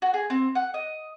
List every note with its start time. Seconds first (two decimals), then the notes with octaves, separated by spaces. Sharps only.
0.02 F#4
0.14 G#4
0.30 C4
0.55 F#5
0.74 D#5